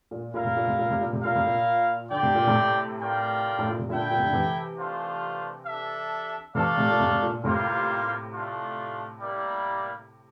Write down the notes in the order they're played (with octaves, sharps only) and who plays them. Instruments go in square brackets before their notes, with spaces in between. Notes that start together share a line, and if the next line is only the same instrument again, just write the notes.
[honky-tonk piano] A#2
[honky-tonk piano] A#2 [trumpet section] E4 A#4 F5
[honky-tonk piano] C3
A#2
C3
A#2
C3
A#2
C3
[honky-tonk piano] A#2 [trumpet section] E4 A#4 F5
[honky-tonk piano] C3
A#2
[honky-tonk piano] D3 [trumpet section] C4 G4 D5 G5
[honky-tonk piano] C3
A#2
A2 C3
[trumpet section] F4 A#4 D5 G5
[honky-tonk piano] A2
A#2
C3
[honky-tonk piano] A#2 D3 [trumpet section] E4 A4 E5 G5
[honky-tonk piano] A#2
C3
D3
C3 E3
[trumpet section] A3 D4 F4 C5
D4 A4 E5
[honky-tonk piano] C3 E3 [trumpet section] A3 D4 A4 D5 F5
[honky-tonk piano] A2 C3
A#2
A2 C3
C3
A#2
[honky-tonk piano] A2 C3 [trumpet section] G3 A#3 F4 C5
[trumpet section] A3 D4 F4
G3 A#3 E4 A#4 D5